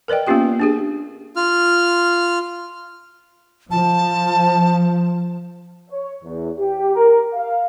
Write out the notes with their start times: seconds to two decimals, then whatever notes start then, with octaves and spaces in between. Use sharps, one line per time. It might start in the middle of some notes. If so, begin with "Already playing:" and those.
0.08 A#4 B4 D5 D#5 G5
0.27 A#3 B3 C#4 F4 G4 G5
0.60 D4 G4 G#4
1.36 F4 F6
3.71 F3 A5
5.90 C#5
6.24 E2
6.58 G4
6.96 A#4
7.33 F5